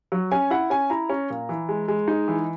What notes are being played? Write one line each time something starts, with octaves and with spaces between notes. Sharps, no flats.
F#3
C#4 G#5
E4 F#5
C#4 G#5
E4 A#5
C#4
A#2
E3
G#3
G#3
D#4
E3